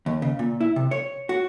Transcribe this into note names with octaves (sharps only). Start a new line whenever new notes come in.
D#2
C#3
A#2
E4
C3
C#5
F#4